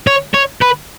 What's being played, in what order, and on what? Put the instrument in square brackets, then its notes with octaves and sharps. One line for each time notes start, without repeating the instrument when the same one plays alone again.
[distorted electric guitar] C#5
C#5
B4